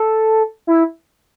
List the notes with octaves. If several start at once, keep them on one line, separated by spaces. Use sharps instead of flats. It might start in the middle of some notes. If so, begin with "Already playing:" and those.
Already playing: A4
E4